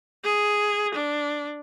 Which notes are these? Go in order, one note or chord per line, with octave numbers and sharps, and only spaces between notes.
G#4
D4